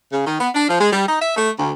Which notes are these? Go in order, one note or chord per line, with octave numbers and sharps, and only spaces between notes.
C#3
D#3
B3
D4
F3
G#3
G3
D#4
E5
A3
D2